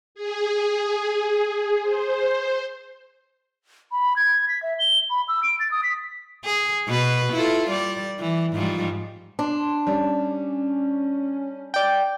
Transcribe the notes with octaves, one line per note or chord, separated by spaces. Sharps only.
G#4
C5
B5
G#6
B6
E5
G7
B5
E6
D7
A6
D#6
B6
G#4
B2 B4
E4 F4 A4
G3 D5
E3
G#2 F3 G3
D4 C6
G3 C#4
D5 G5